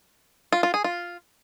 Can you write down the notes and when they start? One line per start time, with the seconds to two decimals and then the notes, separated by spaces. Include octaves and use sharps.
0.52 F4
0.63 F4
0.74 G#4
0.84 F4